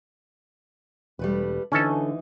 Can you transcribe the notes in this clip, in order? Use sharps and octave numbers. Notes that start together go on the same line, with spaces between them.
E1 G3 A3 B4
D2 D3 E3 C#4 D#4 A4